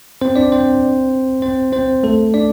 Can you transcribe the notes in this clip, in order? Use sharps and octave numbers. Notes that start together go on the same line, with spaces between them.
C4 C5
D4 D5
C4 C5
C4 C5
C4 C5
A3 A4
D4 D5